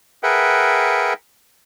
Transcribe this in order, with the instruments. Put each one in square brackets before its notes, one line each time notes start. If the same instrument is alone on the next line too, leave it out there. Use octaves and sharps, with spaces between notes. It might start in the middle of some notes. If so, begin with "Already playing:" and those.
[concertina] G#4 A#4 B4 E5 F#5 G5